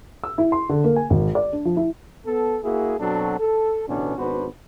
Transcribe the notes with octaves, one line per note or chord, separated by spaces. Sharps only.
E6
E4
C6
D3
A#3
G#5
G#1
D5
D4
F3
E4
B3 A4
A#3 E4 F#4 G#4
B2 F#3 C4 D4 F#4 A4
A4
A1 D2 B2 B3 C#4 D4
G#1 B3 D4 F#4 B4 C5